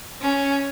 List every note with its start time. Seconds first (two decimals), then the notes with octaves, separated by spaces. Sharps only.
0.21 C#4